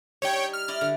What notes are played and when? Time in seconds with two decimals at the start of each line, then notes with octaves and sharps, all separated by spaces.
0.22 G3 D#4 C#5 G5
0.53 F6
0.68 E4 D5 D#5
0.81 D3